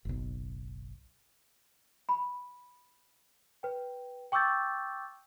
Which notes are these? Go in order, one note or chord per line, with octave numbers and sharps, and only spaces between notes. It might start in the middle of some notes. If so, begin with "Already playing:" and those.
F#1 B1
B5
B4 G5
G5 C#6 D6 E6 G6 A6